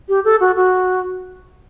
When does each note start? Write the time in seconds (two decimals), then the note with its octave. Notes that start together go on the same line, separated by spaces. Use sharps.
0.09 G4
0.25 A4
0.41 F#4
0.56 F#4